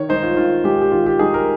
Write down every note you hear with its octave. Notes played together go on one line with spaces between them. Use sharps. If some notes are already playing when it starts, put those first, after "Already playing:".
Already playing: D#3 C#5
G#3 D#4 C5
F4
D#3 F4
G#3 D#4 G4
G4
D#3 F4
G4
G#3 D#4 G#4
A#4